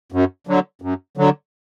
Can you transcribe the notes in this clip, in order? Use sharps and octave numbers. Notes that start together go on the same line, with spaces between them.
F#2
D3 F#3
F#2
D3 F#3